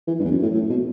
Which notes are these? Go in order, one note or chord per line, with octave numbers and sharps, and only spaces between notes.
E3
G2
E2
F#2
A2
A2
B2